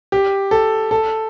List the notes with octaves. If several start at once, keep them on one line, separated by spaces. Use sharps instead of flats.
G4
A4
A4